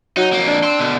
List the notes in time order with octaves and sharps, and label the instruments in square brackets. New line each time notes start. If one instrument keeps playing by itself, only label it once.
[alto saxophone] F#3 [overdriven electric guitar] D#4
[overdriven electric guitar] F2 A#3
[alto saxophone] D4
[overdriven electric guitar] G5 C6
B2 D3